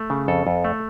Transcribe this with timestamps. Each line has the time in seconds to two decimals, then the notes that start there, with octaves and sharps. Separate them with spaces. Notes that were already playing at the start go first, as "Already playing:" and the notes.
Already playing: A3
0.10 C#3
0.28 F2 A4
0.47 F2
0.64 A3